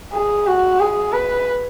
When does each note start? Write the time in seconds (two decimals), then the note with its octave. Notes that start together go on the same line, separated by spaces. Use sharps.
0.13 G#4
0.47 F#4
0.80 G#4
1.13 B4